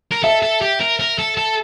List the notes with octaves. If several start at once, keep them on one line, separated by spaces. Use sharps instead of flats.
A#4
A4 E5
A4
G4
A#4
A#4
A4
A4